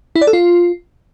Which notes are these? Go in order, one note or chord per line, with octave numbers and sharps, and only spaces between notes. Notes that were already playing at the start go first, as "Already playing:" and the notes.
E4
D5
A4
F4